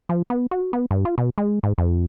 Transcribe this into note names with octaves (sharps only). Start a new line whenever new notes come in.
F3
B3
F#4
B3
G2
F4
B2
G#3
G#2
F2